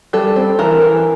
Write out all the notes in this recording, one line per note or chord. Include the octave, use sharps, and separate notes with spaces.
G3 A4
C4
E3 A#4
E3